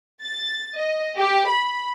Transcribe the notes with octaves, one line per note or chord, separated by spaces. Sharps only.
A6
D#5
G4
B5